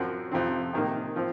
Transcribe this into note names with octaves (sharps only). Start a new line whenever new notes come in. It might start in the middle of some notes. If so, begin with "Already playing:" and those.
Already playing: F#2 F3 C4 F#4
F2 C3 F3 C4
C3 D#3 A#3
F3 C4